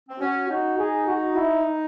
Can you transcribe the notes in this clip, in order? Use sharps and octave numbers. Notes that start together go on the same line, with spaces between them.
C4
C#4 F#4
D#4 F#4
G#4
F#4
E4